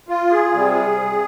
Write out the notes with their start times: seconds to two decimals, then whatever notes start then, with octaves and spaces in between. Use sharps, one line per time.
0.08 F4
0.30 G#4
0.53 C3 G3